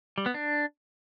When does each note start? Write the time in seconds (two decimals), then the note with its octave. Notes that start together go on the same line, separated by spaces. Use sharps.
0.18 G3
0.26 B3
0.34 D4